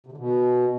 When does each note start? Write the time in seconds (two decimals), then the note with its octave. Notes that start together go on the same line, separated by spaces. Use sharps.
0.07 C3
0.12 D3
0.17 B2